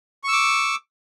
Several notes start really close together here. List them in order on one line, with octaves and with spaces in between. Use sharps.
C#6 E6 D6